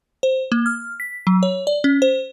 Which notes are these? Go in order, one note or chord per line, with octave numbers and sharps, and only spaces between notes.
C5
A#3
F6
B6
F#3
C#5
D5
C#4
C5